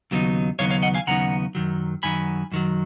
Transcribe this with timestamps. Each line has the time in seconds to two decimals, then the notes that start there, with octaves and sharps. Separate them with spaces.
0.11 D#2 C#3 F#3 B3 D#4
0.59 D#2 C#3 F#3 B3 D#4 C#5 F5
0.71 C#5 F5
0.82 D#5 F#5
0.94 F5 G#5
1.07 D#2 C#3 F#3 B3 D#4 F#5 A#5
1.55 F#2 D#3 F#3
2.03 F#2 D#3 F#3 G#5 B5
2.52 F#2 D#3 F#3